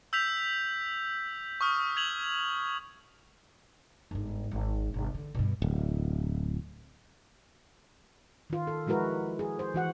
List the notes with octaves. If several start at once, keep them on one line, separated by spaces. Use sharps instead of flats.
E6 G6 B6 F7
C#6 D#6 F6
G#6 F7 F#7
G1 G#2
G#1
G1 C3
D3
G2 B2
D1
D#3 F4
A4
F3 G#3 E4 F#4 A#4 B4
G#4
C5
E3 F#4 F#5